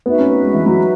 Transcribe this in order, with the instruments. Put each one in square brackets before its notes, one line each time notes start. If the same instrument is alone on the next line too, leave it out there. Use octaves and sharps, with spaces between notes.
[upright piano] B3 [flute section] D#4 F#4 B4 E5
[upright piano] C#4
B3
G#3
E3
F#3